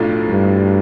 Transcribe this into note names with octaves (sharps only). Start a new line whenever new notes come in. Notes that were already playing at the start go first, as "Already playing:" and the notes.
Already playing: B1 A2 F3 A3 D4
G2